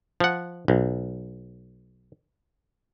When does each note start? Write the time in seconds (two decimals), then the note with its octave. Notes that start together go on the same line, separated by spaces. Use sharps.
0.20 F3 F#5
0.68 B1